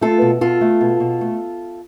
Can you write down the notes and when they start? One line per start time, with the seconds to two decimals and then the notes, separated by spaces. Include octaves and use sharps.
0.01 A3 F4 A4
0.22 B2
0.41 B2 F4 A4
0.61 A3
0.81 B2
1.00 B2
1.21 A3